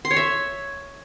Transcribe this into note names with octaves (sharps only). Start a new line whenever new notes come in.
C6
C#5
E5